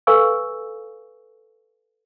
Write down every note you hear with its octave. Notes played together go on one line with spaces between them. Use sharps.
A4 B4 F5 G#5 C#6 E6